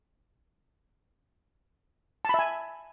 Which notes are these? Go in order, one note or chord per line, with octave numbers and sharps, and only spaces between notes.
E5 G#5 A5 B5